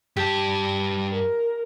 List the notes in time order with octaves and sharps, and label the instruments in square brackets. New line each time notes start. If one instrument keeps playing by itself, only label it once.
[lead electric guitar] G2 A5 [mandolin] G4
[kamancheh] A#4